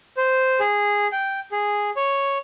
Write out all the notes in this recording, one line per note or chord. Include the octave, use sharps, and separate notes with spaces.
C5
G#4
G5
G#4
C#5